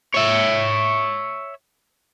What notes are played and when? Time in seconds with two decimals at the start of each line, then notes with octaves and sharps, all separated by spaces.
0.15 C#5 E5